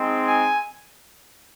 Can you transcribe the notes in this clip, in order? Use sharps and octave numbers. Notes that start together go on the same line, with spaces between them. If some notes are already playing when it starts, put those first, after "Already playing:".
Already playing: G#3 C4 D#4
G#5